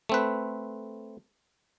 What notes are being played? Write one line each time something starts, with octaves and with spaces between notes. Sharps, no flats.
A3 C4 B4